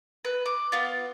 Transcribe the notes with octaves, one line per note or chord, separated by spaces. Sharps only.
B4
D6
B3 F4